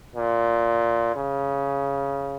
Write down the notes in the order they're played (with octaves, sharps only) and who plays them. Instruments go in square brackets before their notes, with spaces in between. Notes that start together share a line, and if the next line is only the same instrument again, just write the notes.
[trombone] A#2
C#3